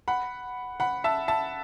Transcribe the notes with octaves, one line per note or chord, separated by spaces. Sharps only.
F#5 B5
F#5 B5
E5 A5
E5 A5